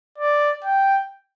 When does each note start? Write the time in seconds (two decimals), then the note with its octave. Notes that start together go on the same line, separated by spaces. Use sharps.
0.18 D5
0.64 G5